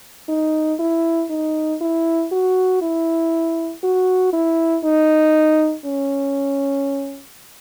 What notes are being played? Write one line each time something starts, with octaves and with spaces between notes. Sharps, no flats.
D#4
E4
D#4
E4
F#4
E4
F#4
E4
D#4
C#4